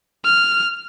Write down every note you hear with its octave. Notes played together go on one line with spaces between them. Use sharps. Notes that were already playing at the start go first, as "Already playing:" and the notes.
F6